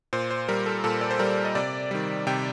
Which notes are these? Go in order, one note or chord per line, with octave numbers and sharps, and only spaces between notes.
A#2 C5
C5
G3 A#4
A4
A#2 A4
D5
C5
G3 A#4
D#5
C3 D5
D#3 G3
C3 G5